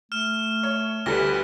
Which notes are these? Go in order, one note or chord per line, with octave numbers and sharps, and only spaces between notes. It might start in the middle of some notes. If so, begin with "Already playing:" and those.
A3 F6 E7
C#5
D2 G3 G4 A4 B4 A#6